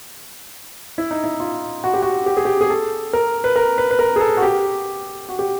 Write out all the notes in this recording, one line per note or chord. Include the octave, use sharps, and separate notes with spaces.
E4
D#4
E4
F4
F#4
G4
F#4
G4
G#4
G4
G#4
A4
A#4
B4
A#4
B4
B4
A#4
G#4
A4
F#4
G4
F#4
G4